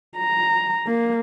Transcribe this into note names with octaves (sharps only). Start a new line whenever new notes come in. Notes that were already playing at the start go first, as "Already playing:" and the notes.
A#5
A#3